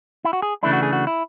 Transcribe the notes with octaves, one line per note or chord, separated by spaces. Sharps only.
E4
F#4
G#4
C#3 E3 A3 D4 E4
F#4
G#4
F#4
E4